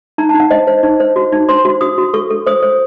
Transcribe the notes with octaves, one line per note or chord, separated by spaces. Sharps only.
D#4 A#5
A5
D#4
F#5
C5 D#5
C5
D#4
C5
F#4
D#4
C5 C6
F#4
F#4 D#6
F#4
A4 C#6
A4
C5 D#6
C5